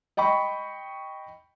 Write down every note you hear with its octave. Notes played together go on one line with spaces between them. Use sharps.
D#5 G5 B5 C#6